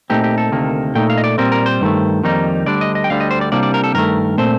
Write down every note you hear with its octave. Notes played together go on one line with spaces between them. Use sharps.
A#2 A3 C4 D#4 G4
G4
A4
D2 C3 D#3 A#3
A#2 A3 D#4 G5
F5
D#5
D5
A#2 G3 C4 A#4
A#4
C5
G2 D#3 A3
F2 D#3 G3 A#3 D#4
D2 D3 G3 D4 D5
D#5
D#5
G5
D2 D3 G3 F5
D#5
C5
D5
C2 C3 G3 A#3 D4 D5
D5
A#4
A4
G2 D#3 A3 A#4
A#2 A3 C4 C5